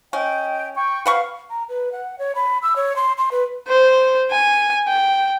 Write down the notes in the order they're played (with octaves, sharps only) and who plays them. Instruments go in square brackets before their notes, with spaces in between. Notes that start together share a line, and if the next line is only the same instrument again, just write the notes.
[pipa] C#4 [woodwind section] D#5 G5
[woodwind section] G5 C#6
[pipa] B4 F#5 C#6 [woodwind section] F5
[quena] A#5
B4
F#5
C#5
B5
E6
C#5
C6
C6
B4
[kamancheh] C5
G#5
G5